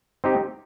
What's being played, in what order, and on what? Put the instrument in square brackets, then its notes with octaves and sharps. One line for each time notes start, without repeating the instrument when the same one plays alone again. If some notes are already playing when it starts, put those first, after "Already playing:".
[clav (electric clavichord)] C4 D#4 G4